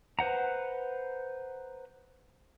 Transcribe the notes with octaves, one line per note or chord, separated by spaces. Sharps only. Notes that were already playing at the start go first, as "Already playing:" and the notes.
B4 C5 F#5 A#5